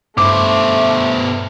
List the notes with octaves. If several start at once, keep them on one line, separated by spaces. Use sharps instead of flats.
G2 B2 A3 C5 B5 D6